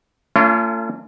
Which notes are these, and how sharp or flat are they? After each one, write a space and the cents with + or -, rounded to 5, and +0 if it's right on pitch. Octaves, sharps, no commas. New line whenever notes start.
A3 +40 C#4 +25 F4 -30